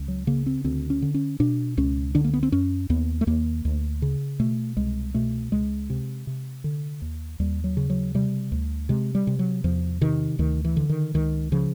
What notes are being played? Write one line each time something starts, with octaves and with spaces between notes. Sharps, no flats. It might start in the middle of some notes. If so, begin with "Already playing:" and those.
Already playing: C#2
F#3
C#3 A#3
C4
D2 C4
C#4
D3
C#4
B2 D4
C#2 C#4
D3 D4
A#3
B3
C4
F#2 C#4
D#2 B3
A3
D#2 A#3
D2
C#3
B2 A3
C2 G#3
B2 A3
C#2 G#3
C3
C3
D3
D#2
D#2 G3
F#3
C#3
F#3
C3 G3
D2
C3 G#3
G3
C3
F#3
E2 F3
C3 D#3
D2 D#3
E3
D3
D#3
C#2 D#3
C#3 F3